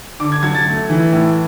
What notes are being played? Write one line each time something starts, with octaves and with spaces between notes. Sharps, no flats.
D3 D6
G#6
F#3 G#6
A6
A3
E3
A2